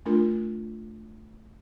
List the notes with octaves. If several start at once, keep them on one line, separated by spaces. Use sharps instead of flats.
A3 D4 F4 A#4